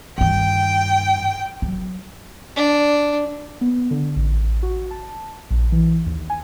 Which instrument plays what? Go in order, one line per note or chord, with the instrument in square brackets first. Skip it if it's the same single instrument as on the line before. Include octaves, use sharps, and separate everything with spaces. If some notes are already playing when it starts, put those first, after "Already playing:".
[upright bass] G2 D#3 [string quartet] G5
[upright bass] F#3
[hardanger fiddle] D4
[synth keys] B3
D3
A1
F#4
A5
A#1
E3
D#2
G#5